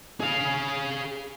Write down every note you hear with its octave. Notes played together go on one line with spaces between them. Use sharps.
G#4 F5